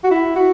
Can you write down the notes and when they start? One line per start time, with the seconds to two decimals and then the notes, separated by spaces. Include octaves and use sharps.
0.04 F#4
0.11 E4
0.36 F#4